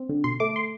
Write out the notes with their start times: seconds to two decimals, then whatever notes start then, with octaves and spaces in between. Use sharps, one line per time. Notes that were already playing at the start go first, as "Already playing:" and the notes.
Already playing: C4
0.09 D3
0.24 B2 C6
0.40 A3 D6
0.56 C6